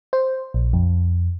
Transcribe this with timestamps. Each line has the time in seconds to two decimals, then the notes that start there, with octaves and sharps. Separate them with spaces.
0.13 C5
0.54 A#1
0.73 F2